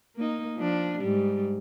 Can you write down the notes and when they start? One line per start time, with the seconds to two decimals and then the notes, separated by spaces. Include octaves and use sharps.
0.16 A#3 D#4
0.57 F3 D4
1.00 G#2 G3